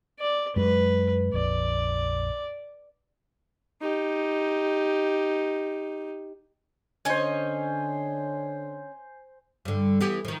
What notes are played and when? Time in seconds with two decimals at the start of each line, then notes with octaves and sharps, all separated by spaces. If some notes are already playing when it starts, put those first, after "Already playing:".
0.19 D5
0.56 F#2 G#3 B4
1.34 A#1 F2 D5
3.81 D#4 G4
7.05 D3 C#4 C5 C#5 D#5 G#5
9.65 G2 D3
10.01 E3 B3 G4
10.25 D#3 F3